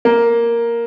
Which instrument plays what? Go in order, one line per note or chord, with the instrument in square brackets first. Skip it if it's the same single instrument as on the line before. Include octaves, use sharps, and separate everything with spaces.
[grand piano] A#3